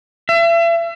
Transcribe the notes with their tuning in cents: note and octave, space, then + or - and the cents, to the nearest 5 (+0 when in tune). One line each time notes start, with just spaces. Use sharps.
E5 +40